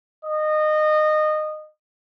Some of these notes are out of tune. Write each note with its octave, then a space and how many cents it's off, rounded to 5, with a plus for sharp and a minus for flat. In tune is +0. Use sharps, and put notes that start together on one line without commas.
D#5 -20